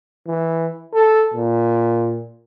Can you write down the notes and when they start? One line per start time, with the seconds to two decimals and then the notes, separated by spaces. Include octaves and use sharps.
0.27 E3
0.93 A4
1.34 A#2